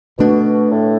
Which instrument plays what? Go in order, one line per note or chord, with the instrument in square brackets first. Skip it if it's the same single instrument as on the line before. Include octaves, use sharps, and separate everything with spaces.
[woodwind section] B2 [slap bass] D3 A3 D4
[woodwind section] A2